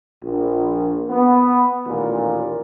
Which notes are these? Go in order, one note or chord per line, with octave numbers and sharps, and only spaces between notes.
A#1
B3
A1 D#2 A#2